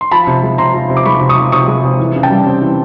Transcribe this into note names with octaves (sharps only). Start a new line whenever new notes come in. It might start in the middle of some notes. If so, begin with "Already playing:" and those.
C6
F3 A5 B5
C3
G#3
C3 A#5 C6
F3
C3
D6
G#3 B5 C#6
C3
C#6 D#6
F3
C3 C#6 D#6
G#3
C3
E3
C#3
G5 A5
G3
C4
E3